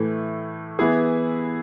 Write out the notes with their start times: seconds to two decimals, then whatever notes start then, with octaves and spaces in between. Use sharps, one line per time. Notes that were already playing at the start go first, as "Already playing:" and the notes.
Already playing: A2 E3 A3
0.79 E3 B3 E4 G#4